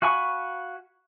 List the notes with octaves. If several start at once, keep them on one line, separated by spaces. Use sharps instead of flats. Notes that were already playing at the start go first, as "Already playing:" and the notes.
F#4 F5 G#5 B5 C#6